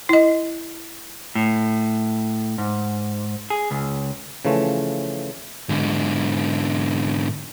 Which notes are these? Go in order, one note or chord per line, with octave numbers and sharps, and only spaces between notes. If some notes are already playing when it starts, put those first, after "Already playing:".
E4 D#5
A2
G#2
G#4
C#2
C#3 E3 F3 A3
G#2 D3